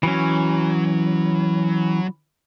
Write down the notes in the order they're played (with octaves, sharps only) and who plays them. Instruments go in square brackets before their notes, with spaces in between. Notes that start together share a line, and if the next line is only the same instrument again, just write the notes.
[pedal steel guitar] E3 C#4 [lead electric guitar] F#3